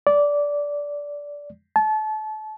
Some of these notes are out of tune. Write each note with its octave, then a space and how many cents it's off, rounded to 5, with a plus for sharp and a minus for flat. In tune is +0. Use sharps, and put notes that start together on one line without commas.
D5 -15
A5 -30